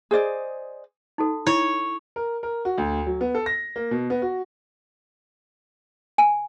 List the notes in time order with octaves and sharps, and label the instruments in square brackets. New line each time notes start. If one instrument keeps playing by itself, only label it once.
[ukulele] G#4 C5 D5 D#5
[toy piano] D#4 F#4 A4
[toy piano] E4 [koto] C#5
[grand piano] A#4
A#4
F#4
D2
F#3
B3
A4
A#6
A#3
B2
B3
F#4
[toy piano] G#5